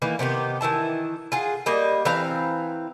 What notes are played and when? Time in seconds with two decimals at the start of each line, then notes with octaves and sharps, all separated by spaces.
0.02 D#3 E3 A#3 B3
0.19 C3 D#3 B3 G4
0.61 D#3 E3 E4 A5
1.32 F4 G#4 F#5
1.66 G3 A#3 D#5
2.05 E3 C4 F5 A#5